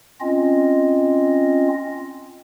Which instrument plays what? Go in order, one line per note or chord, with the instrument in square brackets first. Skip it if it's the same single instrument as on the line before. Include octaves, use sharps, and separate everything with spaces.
[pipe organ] C4 C#4 F4 D#5